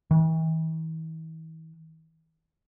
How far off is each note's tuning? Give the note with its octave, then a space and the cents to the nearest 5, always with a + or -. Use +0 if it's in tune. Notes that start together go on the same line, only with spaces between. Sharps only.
E3 -45